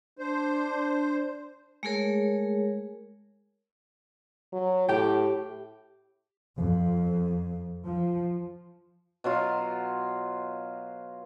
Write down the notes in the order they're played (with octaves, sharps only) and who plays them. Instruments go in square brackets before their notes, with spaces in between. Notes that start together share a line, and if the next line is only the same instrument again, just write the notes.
[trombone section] D4 [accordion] C5
[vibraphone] G#3 A3 G#4 A#4 C#5
[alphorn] F#3
[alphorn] A2 [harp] G4 G5
[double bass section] F2
F3
[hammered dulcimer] B2 F#3 F4